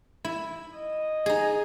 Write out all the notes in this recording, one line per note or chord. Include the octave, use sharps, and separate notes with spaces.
E4
D#5
D#4 G#4